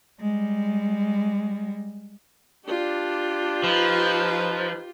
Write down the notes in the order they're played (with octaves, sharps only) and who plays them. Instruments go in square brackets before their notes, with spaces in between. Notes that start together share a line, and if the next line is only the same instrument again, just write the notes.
[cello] G3 G#3
[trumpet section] D4 [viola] F4 G4
[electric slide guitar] F3 [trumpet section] D#4 B4